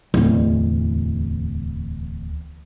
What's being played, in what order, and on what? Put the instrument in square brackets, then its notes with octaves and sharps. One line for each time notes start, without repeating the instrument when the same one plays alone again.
[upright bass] D1 E2